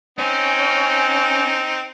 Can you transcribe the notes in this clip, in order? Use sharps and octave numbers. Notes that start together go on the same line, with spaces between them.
C4 C#4 D#4